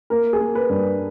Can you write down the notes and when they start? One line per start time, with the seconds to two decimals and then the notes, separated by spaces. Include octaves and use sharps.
0.10 A#3 A#4
0.33 G#4
0.40 A#3
0.55 B4
0.69 G2